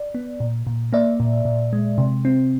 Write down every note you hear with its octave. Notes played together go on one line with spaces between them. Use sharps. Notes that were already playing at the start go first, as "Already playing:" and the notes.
Already playing: D5
B3
A#2
A#2
A#3 D5 E5
A#2
A#2
G#3
C3
C4